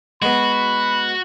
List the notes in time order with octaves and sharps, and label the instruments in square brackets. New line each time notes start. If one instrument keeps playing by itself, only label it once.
[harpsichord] G#3 B3 [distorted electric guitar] F#4 [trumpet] B5